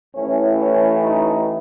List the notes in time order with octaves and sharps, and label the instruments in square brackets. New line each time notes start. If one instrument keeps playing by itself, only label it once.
[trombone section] A1 A2 E3 C#4
C#4
D#4